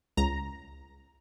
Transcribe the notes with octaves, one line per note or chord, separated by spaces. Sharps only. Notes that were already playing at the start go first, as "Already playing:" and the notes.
C#2 A#5